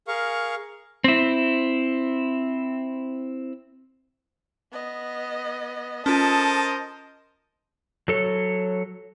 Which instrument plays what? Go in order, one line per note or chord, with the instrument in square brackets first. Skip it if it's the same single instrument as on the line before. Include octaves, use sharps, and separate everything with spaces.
[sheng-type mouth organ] G#4 A#4 F5 C#6
[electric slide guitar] C4 E4
[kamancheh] B3 D#5
[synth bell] C#4 F4 [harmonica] A4 [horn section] A#4 C5 D#5 [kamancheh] A5 D#6
[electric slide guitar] F#3 A4 C#5